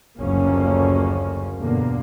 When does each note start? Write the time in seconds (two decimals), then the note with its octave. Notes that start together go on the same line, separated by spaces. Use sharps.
0.19 F#1 D2 F3 A#3 C#4
1.57 E2 G2 B2 D3 A#3